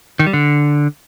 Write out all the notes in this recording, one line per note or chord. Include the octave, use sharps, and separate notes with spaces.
D#3
G3
D3